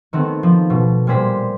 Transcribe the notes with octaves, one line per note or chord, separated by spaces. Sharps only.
D#3 A3 B3 C4
F3
B2
A#2 G3 G#4 C5 B6